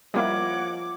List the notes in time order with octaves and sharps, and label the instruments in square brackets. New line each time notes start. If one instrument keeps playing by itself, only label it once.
[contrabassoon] F3 [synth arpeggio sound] G3 A#3 E4 [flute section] C#5 D#5 F#5 [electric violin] D6